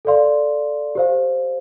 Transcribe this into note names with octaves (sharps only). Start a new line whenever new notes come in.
A4 D5 F5 C6
G4 C5 F5